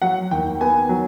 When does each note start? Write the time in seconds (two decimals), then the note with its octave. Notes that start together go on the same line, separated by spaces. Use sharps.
0.02 F#3 F#5
0.31 D#2 G5
0.61 B3 G#5
0.89 F#3